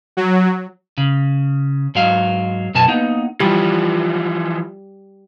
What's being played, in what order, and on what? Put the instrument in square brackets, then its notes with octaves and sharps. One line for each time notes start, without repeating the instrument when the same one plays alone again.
[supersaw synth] F#3
[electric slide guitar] C#3
G#2 F#3 F5
F#2 B2 G#5 A5
A#3 B3 D#4
[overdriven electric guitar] E3 F3 [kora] G3